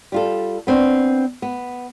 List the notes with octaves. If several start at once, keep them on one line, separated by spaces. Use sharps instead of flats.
G3 F4 A4
B3 C4 D4
B3